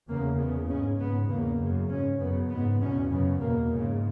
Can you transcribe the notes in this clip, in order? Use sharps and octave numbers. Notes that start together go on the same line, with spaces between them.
E2 C#3 A#3
E2 C#3 B3
G#2 C#4
G#2 B3
E2 C#3 A#3
F#2 C#3
G#2 C#4
F#2 C#3 B3
G#2 B3
E2 B2 C#4
F#2 C#3 B3
E2 B2 A#3
G#2 C#3